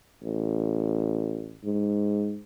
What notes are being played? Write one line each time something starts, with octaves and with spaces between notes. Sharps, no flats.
A1
G#2